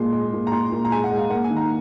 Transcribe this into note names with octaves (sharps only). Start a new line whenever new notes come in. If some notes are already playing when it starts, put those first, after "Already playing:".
Already playing: A#2 G#3 C6
G#3
A#2
A#5
A#2 C6
A#2
A#5
G#3 G#5
F#5
G#3
F5
A#3 F#5
G#5
D#3
A#5